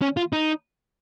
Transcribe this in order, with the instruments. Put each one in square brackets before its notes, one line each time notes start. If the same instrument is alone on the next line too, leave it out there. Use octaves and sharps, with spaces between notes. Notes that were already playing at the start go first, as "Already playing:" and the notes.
[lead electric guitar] C#4
F4
D#4